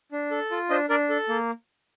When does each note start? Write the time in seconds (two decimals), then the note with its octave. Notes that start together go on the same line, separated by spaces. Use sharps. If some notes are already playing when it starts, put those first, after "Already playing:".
0.12 D4
0.31 A4
0.51 F4
0.70 D4 C5 D#5
0.89 D4 A#4 D5
1.09 A4
1.29 A#3